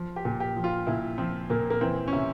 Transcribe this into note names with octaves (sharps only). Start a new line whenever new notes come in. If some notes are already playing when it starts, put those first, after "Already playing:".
Already playing: F3
G4
A#2
G4
F3
F4
A#2 E4
F3 C4
A#2 A#3
A#3
E3 C4
C#4
C3 E4